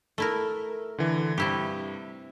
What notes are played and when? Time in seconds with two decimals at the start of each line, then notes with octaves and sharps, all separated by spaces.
0.18 A3 E4 A#4
0.98 D3 E3
1.38 G2 C3 E4 G4